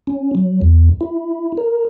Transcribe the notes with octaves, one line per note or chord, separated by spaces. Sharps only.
C#4
F#3
E2
E4
A#4